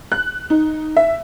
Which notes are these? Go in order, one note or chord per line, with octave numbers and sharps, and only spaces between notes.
F#6
D#4
E5